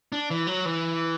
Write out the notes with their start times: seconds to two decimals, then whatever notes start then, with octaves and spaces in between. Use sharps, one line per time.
0.12 D4
0.30 E3
0.47 F#3
0.65 E3